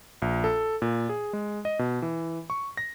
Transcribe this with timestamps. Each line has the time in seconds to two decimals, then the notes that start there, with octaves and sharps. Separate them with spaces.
0.22 A#1
0.44 A4
0.82 A#2
1.09 G#4
1.33 G#3
1.65 D#5
1.79 B2
2.02 E3
2.50 C#6
2.77 A#6